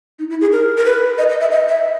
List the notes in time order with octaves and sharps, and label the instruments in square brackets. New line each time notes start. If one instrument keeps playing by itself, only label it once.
[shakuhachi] D#4
E4
G#4
A#4
A#4
B4
D#5
D#5
E5
D#5
E5